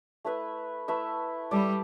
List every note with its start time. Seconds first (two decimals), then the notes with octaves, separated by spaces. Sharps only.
0.24 A3 E4 B4 E5
0.88 A3 E4 B4 E5
1.51 G3 E4 A4 D5